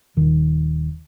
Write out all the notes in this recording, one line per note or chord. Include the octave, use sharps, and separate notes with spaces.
D#1 D#3